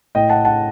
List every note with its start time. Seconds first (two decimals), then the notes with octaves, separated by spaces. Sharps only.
0.15 A2 D#5 G5
0.30 F#5 A5
0.45 F#5 A5